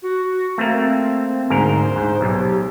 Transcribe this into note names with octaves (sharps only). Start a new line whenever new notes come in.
F#4
A3 A#3 C4
D2 G#2 A#4 C5
G#2
B1 G4